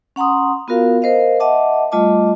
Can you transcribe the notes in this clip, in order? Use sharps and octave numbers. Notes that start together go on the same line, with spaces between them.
C#4 F#5 A#5 C6 D#6
B3 F4 F#4 A#4 F5
A#4 C5 D#5 F5
D#5 E5 F#5 A5 D6
G3 A3 F4 D#5 A5 D6